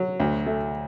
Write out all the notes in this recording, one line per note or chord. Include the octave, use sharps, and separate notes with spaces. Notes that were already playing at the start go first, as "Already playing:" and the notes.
Already playing: F#3
D2
A3